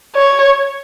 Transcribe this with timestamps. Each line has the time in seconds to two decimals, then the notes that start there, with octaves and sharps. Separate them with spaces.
0.15 C#5